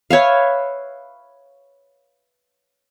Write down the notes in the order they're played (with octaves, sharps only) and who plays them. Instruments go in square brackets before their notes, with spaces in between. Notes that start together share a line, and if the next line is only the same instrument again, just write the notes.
[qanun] B4 C#5 E5 F5